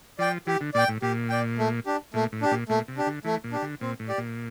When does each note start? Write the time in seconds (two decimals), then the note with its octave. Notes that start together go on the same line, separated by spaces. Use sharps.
0.19 F3 D5 G5
0.47 E3 G4
0.61 D3
0.74 A#2 D5 G5
0.88 A2
1.02 A#2 G4
1.30 D5 G5
1.58 A3
1.86 D4 G4
2.14 A#2 A3
2.32 A2
2.42 D4 G4
2.51 A#2
2.69 A#2 A3
2.88 C3
2.97 D4 G4
3.06 D3
3.25 E3 A3
3.44 A#2
3.52 D4 G4
3.62 D3
3.81 A#2 C4
3.99 A2
4.08 G4 D5
4.18 A#2